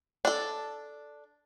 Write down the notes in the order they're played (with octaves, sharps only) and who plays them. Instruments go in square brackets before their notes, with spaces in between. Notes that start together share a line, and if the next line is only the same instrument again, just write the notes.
[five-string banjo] D4 A4